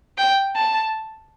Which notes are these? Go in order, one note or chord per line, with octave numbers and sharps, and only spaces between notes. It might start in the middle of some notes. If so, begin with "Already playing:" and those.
G5
A5